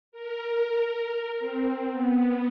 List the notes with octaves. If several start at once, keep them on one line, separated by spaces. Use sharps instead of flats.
A#4
C4
B3